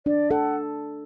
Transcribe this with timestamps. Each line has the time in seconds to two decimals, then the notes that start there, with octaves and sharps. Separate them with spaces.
0.06 D4 D5
0.30 A4 F#5